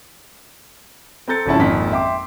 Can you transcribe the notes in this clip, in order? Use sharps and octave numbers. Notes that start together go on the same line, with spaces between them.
C4 A4 A#5 G6 A6 C#7
G#1 C#3 F3 C#4 E4 A5
G#1 F2 A#2 D#4 B6
E5 G5 C6 D6